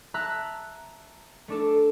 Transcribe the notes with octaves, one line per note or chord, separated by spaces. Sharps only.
E5 A5 A#5 E6 F#6
A3 D4 A4